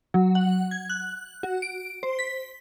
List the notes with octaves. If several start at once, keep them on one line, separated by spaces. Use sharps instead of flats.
F#3
F#5
G#6
F#6
F#4
D7
C5
B6